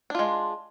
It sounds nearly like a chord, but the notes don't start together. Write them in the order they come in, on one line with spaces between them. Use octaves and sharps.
D4 F4 G#3